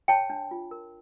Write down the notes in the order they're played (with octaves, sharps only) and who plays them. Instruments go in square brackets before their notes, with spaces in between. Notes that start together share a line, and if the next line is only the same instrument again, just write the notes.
[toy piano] C#5 G5 A5
D4
F4
A#4